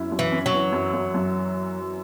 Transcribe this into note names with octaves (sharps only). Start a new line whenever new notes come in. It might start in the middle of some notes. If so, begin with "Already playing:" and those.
Already playing: F#2 C#4 E4
F#2
E3
C#4
F#3
E3
F#2
F#2
F#2